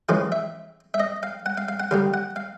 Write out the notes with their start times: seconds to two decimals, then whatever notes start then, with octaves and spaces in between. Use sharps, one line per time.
0.09 F2 C#3 E3 G#3 F5
0.32 E5
0.94 E5
1.00 D#5
1.23 F5
1.46 F#5
1.57 F5
1.68 F5
1.80 F#5
1.91 D#2 D3 G3 F5
2.14 F#5
2.36 F5